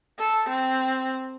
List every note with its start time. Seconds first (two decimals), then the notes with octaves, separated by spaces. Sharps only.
0.19 A4
0.49 C4